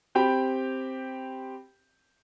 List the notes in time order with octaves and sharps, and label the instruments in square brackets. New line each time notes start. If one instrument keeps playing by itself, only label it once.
[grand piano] C4 G4 G5 B5